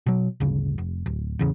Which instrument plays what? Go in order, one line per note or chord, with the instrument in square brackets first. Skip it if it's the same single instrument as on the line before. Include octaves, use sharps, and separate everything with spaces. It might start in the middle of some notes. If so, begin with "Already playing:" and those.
[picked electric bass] B2 F#3
D1 G1 C#3
F1
D1
A1 E2 C#3